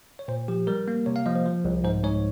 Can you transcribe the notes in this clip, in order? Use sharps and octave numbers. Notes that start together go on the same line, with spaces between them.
C#5
A#2 C5
F3 G4
G3 A#4
A#3
C3 C#5
F5
F3 D#5
C5
F3
C2
G#2 C5
G#2 C#5